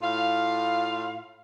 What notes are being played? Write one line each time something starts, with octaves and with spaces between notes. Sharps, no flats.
A2 F4 F5